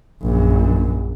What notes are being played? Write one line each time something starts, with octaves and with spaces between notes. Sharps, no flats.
A#1 F#2